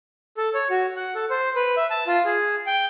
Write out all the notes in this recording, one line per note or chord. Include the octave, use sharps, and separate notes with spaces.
A4
C#5
F#4
F#5
A4
C5
B4
E5
A5
F4
G#4
G5